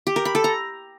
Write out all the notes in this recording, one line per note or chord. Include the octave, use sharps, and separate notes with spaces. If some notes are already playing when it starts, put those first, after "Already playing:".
G4
A#4
B5
A4
A#5